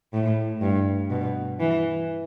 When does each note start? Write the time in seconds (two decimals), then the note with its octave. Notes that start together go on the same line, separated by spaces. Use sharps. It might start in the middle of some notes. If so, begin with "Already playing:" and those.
0.13 A2
0.61 G2
1.10 B2
1.60 E3